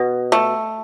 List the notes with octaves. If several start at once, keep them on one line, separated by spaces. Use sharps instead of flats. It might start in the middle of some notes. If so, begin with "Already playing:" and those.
Already playing: B2
A3